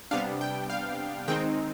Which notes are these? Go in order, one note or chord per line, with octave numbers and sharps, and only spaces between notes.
C3 G3 B3 D4 F5
G5
F5
D#3 G#3 C4 D#4 G5